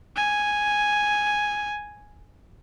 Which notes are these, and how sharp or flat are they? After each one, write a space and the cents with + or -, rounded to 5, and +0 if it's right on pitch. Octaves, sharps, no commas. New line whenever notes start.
G#5 +0